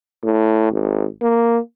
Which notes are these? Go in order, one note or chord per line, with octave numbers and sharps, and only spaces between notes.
A2
G#1
A#3